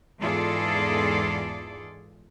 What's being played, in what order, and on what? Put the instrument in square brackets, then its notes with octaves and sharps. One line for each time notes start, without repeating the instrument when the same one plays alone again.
[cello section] E2 G#2 F4 G#4 A4 D5